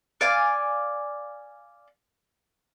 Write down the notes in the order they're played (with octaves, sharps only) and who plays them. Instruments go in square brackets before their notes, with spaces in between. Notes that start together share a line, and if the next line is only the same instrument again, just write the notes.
[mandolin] D5 F5 G#5 D6